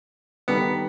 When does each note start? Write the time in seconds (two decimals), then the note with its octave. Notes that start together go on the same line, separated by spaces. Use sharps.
0.48 D#3 G3 B3 D#4 A4